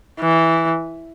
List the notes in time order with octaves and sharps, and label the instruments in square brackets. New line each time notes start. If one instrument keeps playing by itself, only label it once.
[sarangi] E3